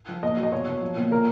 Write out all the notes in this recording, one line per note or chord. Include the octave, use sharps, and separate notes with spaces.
F3
A#2 D#5
F#3
D#5
B2 C#5
B2
F3
A#2
A#2 A#4